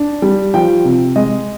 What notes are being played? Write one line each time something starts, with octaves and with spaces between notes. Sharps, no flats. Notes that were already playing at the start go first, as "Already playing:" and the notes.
Already playing: D4
G3
F3 G5
C3
G#3 D#5